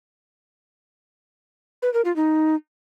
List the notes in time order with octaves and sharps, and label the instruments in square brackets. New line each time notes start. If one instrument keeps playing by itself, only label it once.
[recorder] B4
A#4
F4
D#4